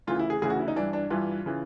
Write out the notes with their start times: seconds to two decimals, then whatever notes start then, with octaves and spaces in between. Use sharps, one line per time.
0.07 D2 C#3 E3 F4
0.19 E4
0.30 G#4
0.42 D2 C#3 E3 G#4
0.50 F#4
0.59 E4
0.68 D#4
0.76 G2 E3 D4
0.93 D4
1.10 G2 E3 F4
1.46 C#3 E3